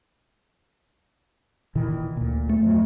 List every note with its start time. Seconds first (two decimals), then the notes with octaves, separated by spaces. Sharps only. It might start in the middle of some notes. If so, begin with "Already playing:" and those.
1.75 A#2 D#3 E3
2.17 D2 A#2
2.50 A3
2.62 F2 F#3